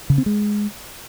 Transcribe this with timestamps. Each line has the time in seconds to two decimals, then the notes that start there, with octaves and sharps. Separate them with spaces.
0.10 C#3
0.18 C4
0.26 G#3